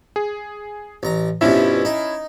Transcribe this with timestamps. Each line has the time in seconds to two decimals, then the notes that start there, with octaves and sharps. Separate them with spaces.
0.16 G#4
1.03 A1 A#5
1.41 G2 B2 F3 C#4 E4 E5
1.85 D#4